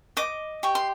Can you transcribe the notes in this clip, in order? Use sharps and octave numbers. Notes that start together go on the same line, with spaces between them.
D#5 D6
G4 C#6
C6